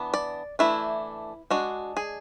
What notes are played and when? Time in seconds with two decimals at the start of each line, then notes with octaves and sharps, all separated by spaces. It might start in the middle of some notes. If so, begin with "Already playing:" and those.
Already playing: E3 B3 D4
0.14 D5
0.59 E3 A3 D4 E4
1.50 G#3 D4 F#4
1.97 G#4